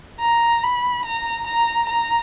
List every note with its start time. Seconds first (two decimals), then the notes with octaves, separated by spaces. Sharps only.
0.21 A#5
0.63 B5
1.05 A#5
1.47 A#5
1.89 A#5